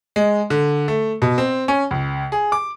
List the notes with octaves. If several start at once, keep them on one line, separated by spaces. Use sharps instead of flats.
G#3
D3
A3
B2
C4
C#4
C#2
G#4
D6